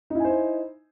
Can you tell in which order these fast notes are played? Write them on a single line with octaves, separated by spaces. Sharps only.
D#4 E4 G#5 C5